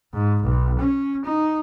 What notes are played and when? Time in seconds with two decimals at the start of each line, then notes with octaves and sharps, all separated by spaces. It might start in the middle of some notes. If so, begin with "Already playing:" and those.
0.13 G#2
0.43 B1
0.80 C#4
1.25 D#4